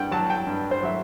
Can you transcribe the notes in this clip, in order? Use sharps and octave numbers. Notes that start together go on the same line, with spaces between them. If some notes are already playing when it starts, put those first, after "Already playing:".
Already playing: G2 F#5 G5
F#3 A5
G5
G2
C5
F#3 E5